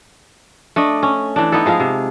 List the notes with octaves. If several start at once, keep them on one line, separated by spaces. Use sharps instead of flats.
A3 D4 D#5
C#4
E3 D4
B3 D#4 E4 A4
F3 G#3 G#4 F5
C3